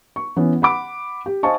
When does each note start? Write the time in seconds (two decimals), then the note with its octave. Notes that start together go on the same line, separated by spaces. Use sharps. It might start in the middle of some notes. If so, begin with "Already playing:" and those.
0.16 C#6
0.36 E3 B3 C#4
0.62 F#5 B5 D6
1.26 G4
1.43 C5 D#5 F5 G#5 A5 C#6